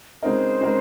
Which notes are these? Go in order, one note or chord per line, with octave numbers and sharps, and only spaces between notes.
C#3 G#3 C4 D#4 A#4 C5
C#3 G#3 C4 D#4 A#4